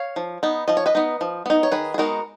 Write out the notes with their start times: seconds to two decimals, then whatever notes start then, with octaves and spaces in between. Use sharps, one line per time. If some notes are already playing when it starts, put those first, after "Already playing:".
Already playing: C#5 F5
0.16 F3
0.43 B3 D#4
0.68 F3 D#5
0.77 C#5
0.86 B4 D#5
0.95 B3 D#4
1.21 F3
1.46 B3 D#4
1.63 C#5
1.72 D#3 G#4 B4
1.94 G#4
1.98 G#3 B3 D#4 F#4 A#4